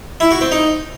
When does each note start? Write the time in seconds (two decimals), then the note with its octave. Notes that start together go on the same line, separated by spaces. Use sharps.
0.20 E4
0.31 F#4
0.41 C4
0.52 D#4